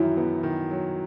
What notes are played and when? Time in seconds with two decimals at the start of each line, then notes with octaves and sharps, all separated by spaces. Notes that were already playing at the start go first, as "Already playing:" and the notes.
Already playing: F#2 D#3 F#3 E4
0.17 B3
0.43 D#3
0.71 F#3